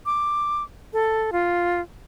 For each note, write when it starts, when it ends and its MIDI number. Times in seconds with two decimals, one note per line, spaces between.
0.06 0.63 86
0.93 1.30 69
1.32 1.81 65